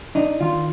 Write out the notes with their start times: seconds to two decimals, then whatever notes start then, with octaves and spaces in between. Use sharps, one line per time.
0.15 D4 D#4
0.40 D#3 F4